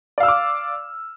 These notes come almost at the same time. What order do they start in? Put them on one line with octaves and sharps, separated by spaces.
D5 F5 E6 F6 D6